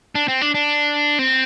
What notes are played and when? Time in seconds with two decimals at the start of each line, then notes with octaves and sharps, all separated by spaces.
0.15 D4
0.28 C4
0.41 D4
0.54 D4
1.19 C4